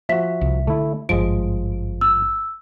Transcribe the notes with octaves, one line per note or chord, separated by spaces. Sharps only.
F3 F#4 E5 B6
C2
D3 A3 E4
G#1 G2 F3 G#3 D#5 D7
E6